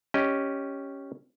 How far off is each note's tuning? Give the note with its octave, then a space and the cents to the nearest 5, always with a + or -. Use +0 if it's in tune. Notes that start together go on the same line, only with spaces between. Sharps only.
C#4 +0 G4 +0 D#5 +0